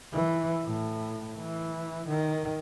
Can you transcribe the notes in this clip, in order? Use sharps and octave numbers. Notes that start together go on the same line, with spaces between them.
E3
A2
E3
D#3